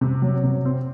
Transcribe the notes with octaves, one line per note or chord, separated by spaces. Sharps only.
C3
F#3
C3
C4